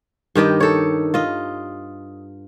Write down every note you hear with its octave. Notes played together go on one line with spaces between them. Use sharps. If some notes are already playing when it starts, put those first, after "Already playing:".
G2 D#3 G4 D#5
A4 C#5
F4 D#5